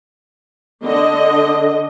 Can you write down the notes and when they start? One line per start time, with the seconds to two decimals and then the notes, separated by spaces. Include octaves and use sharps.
0.84 D3 D#5